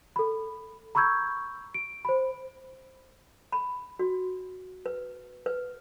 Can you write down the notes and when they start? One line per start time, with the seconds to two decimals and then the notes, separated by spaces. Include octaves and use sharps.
0.16 A4 B5
0.95 A#5 B5 C#6 E6 G6 G#6
1.74 D7
2.05 C5 B5
3.52 B5
3.99 F#4
4.86 B4
5.46 B4